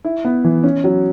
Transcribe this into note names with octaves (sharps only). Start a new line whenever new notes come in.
E4
B3
E3
C#4
F#3